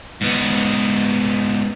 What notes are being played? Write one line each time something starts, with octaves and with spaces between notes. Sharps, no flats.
G#2 B3